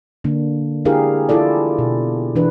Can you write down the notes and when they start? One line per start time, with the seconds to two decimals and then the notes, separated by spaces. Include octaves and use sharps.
0.24 D3 A#3 D4
0.85 D4 E4 G4 G#4 A#4 F5
1.29 E4 F4 A4 D5
1.79 B2
2.36 E3 D4 B4